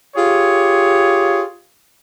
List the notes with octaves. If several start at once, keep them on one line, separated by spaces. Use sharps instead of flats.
F4 G4 G#4 C#5